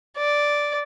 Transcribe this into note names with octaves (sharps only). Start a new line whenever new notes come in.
D5